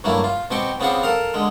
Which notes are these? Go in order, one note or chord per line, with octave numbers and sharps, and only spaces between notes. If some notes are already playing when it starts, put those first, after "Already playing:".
G2 F#3 A3 A#3 E4
F4
B2 C4 G4 G5 C#6
C#3 B3 C4 F4 G4 F#5
A4 A#4 F5
D3 G#3